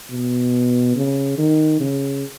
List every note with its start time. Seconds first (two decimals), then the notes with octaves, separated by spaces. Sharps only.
0.11 B2
0.96 C#3
1.38 D#3
1.80 C#3